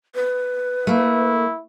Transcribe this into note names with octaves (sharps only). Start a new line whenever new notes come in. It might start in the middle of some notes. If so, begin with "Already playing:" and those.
B4
A3 A#3 E4